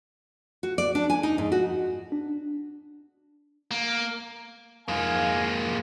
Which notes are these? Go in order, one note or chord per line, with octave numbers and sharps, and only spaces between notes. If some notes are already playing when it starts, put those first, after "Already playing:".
F#4
D5
D4
G#5
D#4
G#2
F#4
D4
A#3
F2 G#2 G#3 A#3 F5 G#5